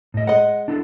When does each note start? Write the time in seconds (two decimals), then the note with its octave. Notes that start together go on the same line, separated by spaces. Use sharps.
0.14 A2 D#5
0.27 G#3 D#5 F#5
0.68 D4 E4 A4